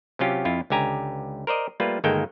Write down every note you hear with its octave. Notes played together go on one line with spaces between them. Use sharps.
C3 F#3 C#4 F4 G4
F2 E4 F4
C#2 D3 G4 G#5 A#5
A#4 C5 D5 D#5
G3 A3 A#3 F4 B4
G1 D#3 G#3 A#3 A4 G5